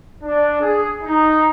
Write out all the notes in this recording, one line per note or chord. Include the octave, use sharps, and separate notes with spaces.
D4
G#4
D#4